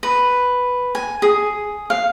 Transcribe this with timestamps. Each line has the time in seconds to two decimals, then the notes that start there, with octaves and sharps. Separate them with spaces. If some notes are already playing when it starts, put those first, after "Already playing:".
0.03 B4
0.95 G#5
1.22 G#4
1.90 F5